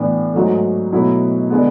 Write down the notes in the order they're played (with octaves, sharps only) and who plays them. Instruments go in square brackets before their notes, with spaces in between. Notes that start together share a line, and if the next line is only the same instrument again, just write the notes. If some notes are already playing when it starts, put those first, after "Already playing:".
Already playing: [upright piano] A2 E3 B3 D4
G#2 F#3 A3
B2 F#3 A3 E4
D3 G#3 B3